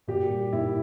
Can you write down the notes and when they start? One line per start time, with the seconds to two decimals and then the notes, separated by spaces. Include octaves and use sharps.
0.07 A#2 G4
0.29 G3
0.53 A#2 E4